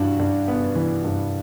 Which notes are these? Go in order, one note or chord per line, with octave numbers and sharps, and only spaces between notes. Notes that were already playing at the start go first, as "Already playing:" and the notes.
Already playing: G2 E3 D4 F#4
G2
B3
E3
G2